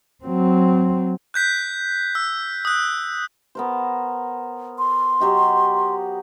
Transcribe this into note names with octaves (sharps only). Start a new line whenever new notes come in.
F#3 C4
F#6 G6 B6
E6
D#6 F#6
B3 A#4 C5
C6
F#3 G4 D#5